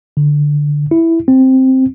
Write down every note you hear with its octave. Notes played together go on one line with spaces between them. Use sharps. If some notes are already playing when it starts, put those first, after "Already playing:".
D3
E4
C4